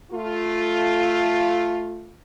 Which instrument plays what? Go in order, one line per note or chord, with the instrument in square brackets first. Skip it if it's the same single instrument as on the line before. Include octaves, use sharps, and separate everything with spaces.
[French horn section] A3 F4